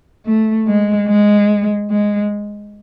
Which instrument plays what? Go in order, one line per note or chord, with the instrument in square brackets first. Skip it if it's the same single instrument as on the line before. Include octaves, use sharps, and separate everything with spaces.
[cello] A3
G#3
G#3
G#3